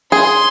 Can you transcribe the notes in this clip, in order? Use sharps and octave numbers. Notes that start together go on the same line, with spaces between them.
G#4 C6